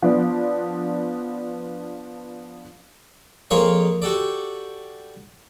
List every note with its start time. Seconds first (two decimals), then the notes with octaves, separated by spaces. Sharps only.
0.02 F3 B3 D4
3.51 F2 A#3 F4 G#4 C#5 D#5
4.02 F#4 G4 A4 D5